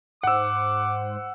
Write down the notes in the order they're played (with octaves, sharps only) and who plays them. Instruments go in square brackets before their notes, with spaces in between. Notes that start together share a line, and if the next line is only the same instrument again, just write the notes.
[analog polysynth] G#2 C5 [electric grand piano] F#5 E6 [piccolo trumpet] D6